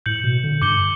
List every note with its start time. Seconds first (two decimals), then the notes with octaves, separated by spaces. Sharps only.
0.06 A2 G6 C#7 F#7
0.24 B2
0.44 D3
0.62 G2 D6 G6 C#7 G7